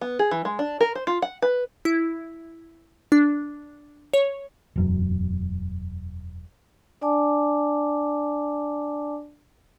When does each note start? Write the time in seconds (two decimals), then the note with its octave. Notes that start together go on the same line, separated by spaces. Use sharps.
0.01 B3
0.19 G#4
0.31 E3
0.45 G#3
0.59 D4
0.81 A#4
0.95 C5
1.07 F4
1.22 F#5
1.42 B4
1.85 E4
3.12 D4
4.14 C#5
4.76 E1 F#2
7.01 D4 D5 G#5 A5 D6